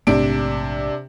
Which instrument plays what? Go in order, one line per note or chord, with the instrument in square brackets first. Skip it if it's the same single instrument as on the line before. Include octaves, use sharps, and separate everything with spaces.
[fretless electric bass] A#1 G#2 A3 [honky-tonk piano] C3 D4 D7